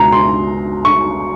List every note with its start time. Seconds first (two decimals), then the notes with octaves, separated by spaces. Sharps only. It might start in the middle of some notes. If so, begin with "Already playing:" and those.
Already playing: C#2 B2 A#5
0.12 C6
0.85 C#6